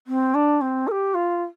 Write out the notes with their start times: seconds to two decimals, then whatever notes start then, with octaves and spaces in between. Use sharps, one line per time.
0.07 C4
0.35 D4
0.61 C4
0.88 A#4
0.91 G4
1.14 F4